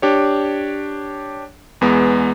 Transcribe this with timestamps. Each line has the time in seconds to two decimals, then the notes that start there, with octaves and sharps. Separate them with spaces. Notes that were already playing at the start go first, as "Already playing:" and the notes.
0.02 D4 G4 C#5
1.81 E2 G#3 B3